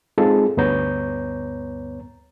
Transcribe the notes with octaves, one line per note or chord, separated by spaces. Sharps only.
G#3 C4 D#4 F4 G#4 A4
D2 G2 B3 C#5 A#5 G6